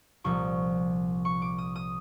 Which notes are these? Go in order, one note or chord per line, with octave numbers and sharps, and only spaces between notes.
C2 A#2 F3 C#6
C#6
D6
D#6
D#6